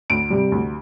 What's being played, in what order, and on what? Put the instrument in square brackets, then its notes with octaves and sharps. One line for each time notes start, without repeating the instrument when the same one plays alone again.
[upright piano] D2 D7
C3 G3
D2